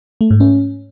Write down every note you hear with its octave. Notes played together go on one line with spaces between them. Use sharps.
A3
G#2
C#4